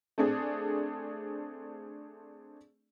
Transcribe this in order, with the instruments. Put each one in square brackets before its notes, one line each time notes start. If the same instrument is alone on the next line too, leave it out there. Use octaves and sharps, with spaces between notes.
[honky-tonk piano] A3 C4 D4 G#4